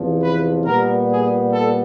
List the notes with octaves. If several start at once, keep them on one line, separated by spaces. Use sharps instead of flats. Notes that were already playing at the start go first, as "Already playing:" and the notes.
Already playing: E2 C3 F3
B4
A#2 G3 B3 A#4
G#4
A4